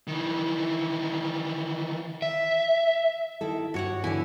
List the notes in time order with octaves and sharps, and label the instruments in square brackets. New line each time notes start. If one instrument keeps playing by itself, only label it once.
[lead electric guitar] D#3 E3
[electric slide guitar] E5
[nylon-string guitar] D#3 E4 A4
[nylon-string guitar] G2 [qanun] F#4 C#5 F#5
[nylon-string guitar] D3 E3 G#5 [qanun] E4